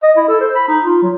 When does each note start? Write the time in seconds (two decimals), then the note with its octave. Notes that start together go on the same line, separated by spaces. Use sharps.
0.03 D#5
0.16 E4
0.28 A4
0.41 C5
0.55 B5
0.68 D#4
0.84 F4
1.02 F#3